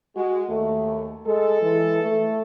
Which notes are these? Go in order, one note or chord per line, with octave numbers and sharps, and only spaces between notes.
G#3 F#4
D#2 A3
G#3 A4
E3
A3